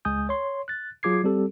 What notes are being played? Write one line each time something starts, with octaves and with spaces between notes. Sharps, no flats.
C#2 G#3 G#5 D#6 G6
C#5 C6
F#6 A6
F#3 F4 G#4 D6 G#6 C7
G3 C4 G4 A4